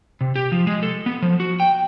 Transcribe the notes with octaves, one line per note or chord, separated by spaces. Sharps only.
C3
G4
F3
G#3
A4
B3
F3
F#4
G5